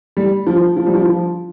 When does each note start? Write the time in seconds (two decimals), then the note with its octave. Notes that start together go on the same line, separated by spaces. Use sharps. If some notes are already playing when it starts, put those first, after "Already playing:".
0.17 G3
0.47 F3
0.77 F3
0.86 G3
0.94 F3
1.07 F3